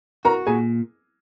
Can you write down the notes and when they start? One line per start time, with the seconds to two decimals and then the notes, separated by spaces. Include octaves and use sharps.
0.25 F#4 A#4 A#5
0.47 A#2 G#4 G#5